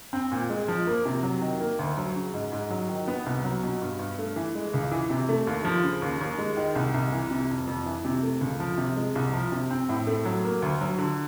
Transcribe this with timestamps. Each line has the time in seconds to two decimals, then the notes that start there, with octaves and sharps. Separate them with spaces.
0.13 C4
0.32 A#2
0.50 G#3
0.68 F3
0.87 A#3
1.06 C3
1.23 F#3
1.42 D#3
1.60 A#3
1.79 D2
1.98 F#3
2.16 C#3
2.34 G#2
2.52 G#2
2.70 F#3
2.89 D#3
3.08 B3
3.26 C2
3.44 F#3
3.63 B2
3.82 G2
3.99 G2
4.19 A3
4.36 E3
4.55 G#3
4.74 C#2
4.92 E3
5.10 C3
5.29 A3
5.47 D#2
5.65 F3
5.83 C#3
6.02 D#2
6.21 D#2
6.38 G#3
6.57 D#3
6.75 C2
6.94 C2
7.12 E3
7.31 C3
7.50 F2
7.67 F2
7.86 E3
8.05 C3
8.23 A3
8.41 C#2
8.60 F3
8.78 C3
8.96 G#3
9.15 C2
9.33 F3
9.52 C3
9.71 C4
9.89 A2
10.07 A3
10.25 F#3
10.44 A#3
10.62 D2
10.81 F#3
10.99 D3